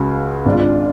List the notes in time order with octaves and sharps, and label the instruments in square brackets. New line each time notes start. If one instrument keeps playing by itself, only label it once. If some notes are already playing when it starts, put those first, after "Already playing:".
Already playing: [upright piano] C#2 C#3 F#4
G#1 D4
G#2 F4
D4